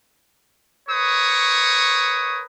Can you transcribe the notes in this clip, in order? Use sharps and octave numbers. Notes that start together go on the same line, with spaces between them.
A#4 B4 C#5 C#6 D#6